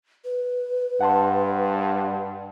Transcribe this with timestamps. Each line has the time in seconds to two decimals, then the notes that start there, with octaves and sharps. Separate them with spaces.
0.25 B4
1.01 G2 F#5 A5 C6